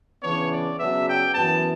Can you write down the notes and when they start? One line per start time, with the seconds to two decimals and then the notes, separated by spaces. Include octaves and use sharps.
0.23 C#3 E3 B3 D4 C#5
0.51 D5
0.79 C#3 F#3 B3 D4 E5
1.07 G5
1.35 F#2 E3 B3 A5